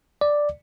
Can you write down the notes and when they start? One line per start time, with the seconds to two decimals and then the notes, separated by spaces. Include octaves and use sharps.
0.21 D5